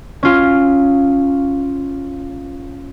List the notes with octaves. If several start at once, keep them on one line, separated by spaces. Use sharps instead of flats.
C#4 F4